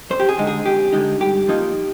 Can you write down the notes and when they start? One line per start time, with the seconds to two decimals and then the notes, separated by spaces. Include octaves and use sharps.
0.10 F2 C5
0.20 G4
0.29 G#4
0.38 D3 G#3 D#4
0.47 G#4
0.66 F2 G4
0.93 D3 G#3 D#4
1.20 G2 G4
1.48 F3 A#3 D#4